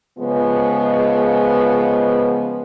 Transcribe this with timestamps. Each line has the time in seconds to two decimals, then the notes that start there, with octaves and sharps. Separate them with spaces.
0.18 C#3 F3 G#3 B3